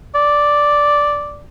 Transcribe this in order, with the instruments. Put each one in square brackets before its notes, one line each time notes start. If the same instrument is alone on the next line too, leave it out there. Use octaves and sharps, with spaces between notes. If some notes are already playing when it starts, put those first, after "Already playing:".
[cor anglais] D5